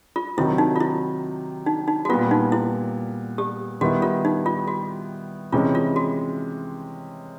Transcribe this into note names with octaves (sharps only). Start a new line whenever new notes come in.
F4
C3 D#3 F#3 E4
D#4
F4
E4
D#4
D#4
F#4
A#2 G3 B3 F4
D#4
E4
G4
D#3 G3 B3 E4 F#4
F4
D#4
F4
F#4
C3 E3 G#3 C#4 F4
F4
F#4